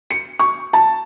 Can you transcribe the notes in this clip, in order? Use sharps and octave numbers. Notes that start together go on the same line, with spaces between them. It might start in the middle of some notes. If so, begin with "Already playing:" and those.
C#7
C#6
A5